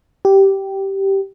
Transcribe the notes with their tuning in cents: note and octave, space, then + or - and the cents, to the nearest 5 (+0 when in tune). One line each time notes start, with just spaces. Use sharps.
G4 -10